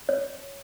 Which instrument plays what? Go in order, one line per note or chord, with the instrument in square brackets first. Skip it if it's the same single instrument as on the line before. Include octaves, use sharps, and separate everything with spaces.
[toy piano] C#5